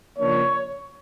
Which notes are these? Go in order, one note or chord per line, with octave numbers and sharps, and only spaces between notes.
C#3 F3 A#3 D4 C#5